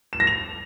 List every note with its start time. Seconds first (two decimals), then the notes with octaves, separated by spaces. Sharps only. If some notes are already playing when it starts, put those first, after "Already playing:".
0.13 E7
0.20 A#6
0.27 F7